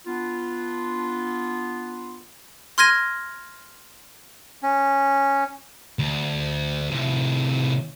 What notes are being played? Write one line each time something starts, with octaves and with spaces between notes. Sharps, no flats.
B3 D4 F4
C6 F6 G#6 A#6 D#7
C#4
D2
A2 C3